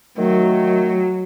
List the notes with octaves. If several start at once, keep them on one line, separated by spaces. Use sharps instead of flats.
D#3 F#3 A3